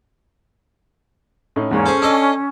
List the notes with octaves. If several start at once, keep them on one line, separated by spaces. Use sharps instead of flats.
A2 C#4 D#4
E2 G#2 A#3 C#4
G#4 A4 C5
D4 A4 D#5 E6